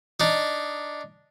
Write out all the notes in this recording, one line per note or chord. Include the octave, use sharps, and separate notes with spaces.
D4 D#4